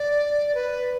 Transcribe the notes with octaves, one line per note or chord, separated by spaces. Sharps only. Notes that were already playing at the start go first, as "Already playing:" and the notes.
Already playing: D5
B4